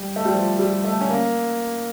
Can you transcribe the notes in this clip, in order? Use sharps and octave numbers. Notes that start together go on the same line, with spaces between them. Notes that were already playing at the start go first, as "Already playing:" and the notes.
Already playing: G3
A3
G3
F3
G3
A3
C#4
A#3